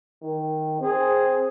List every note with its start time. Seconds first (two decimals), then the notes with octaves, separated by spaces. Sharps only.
0.23 D#3
0.80 C4 G#4